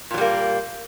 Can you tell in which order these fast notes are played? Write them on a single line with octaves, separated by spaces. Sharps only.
A#2 F#3 G3 A#3